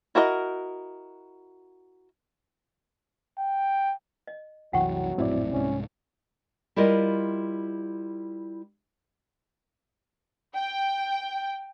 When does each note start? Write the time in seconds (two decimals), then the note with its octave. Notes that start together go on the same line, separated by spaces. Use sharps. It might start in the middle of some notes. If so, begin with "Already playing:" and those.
0.15 E4 F#4 A#4 D5 D#5
3.39 G5
4.27 D#5
4.73 C2 F#2 E3 F#3 F#5 G5 C#6
5.18 A#1 F#2 A2 C4 E4 D5
5.52 C2 G#2 C#4
6.76 G3 E4 F4 A#4 D#5
10.55 G5